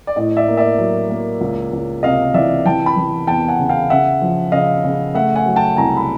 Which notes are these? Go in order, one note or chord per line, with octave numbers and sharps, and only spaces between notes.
D5
A2 D#5
D5 E5
A#3
D5 E5
F#3
A#3
C#2
C#2
C3 D#5 F5
E3 D5 E5
E3 G5 A5
A5 B5
E3
E2 G5 A5
F#5 G#5
C#3
F5 G5
C#3 E5 F#5
F3
C#3 D#5 F5
C#3
A3 E5 F#5
F#5 G#5
F#3
G5 A5
C2 G#5 A#5
B5